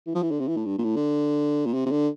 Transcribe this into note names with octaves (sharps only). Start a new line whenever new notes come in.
E3
F3
E3
D3
C3
E3
A2
G2
A#2
A2
D3
A#2
C3
C3
D3